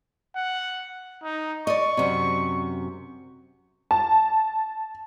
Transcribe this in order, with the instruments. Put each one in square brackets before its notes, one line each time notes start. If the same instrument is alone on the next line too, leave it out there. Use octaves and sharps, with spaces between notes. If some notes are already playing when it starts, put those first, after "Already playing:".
[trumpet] F#5
D#4
[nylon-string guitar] D5 D#5 [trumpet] C#6
[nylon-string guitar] F#2 C3
[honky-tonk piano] A5